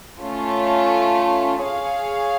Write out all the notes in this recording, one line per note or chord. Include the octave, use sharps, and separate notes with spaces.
A3 C#4 F4
G#4 C#5 F5